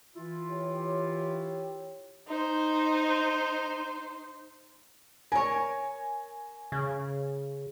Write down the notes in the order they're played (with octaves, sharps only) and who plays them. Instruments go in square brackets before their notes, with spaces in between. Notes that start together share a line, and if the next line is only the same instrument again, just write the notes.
[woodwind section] E3 E4 F4
[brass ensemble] G4 C#5
[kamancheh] D#4 C5
[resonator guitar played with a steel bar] A#4 C#5 [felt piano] G#5
[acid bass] C#3